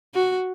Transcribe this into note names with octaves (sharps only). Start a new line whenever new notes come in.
F#4